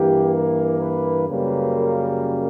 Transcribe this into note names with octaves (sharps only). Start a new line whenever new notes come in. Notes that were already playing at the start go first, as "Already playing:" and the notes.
Already playing: G2 E3 A#3 G4
A#4
B4
F#2 C#3 G3 A#3 B4
A#4